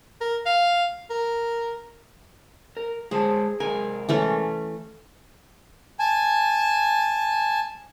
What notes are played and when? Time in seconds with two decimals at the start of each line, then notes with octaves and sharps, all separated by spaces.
0.21 A#4
0.46 F5
1.10 A#4
2.77 A#4
3.11 G#3 G#4 C5 A5
3.60 C3 G#3 A#4 G#5
4.09 E3 A3 C#4
5.99 G#5 A5